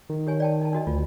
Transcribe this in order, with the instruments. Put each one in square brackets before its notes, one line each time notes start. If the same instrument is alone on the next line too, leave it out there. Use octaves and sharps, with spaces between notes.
[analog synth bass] D#3
[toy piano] G4 C#5 G#5
D5 G5 A5
D#4 A5
D4 F#4 D#5
[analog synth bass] D2 [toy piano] F4